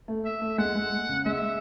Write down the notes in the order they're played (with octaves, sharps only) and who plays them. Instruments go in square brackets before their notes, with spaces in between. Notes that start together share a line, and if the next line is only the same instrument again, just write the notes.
[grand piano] A3
[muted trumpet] E5
[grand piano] A3
[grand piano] G#3 [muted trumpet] F#5
[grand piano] G#3
C#3
[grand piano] G#3 [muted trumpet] E5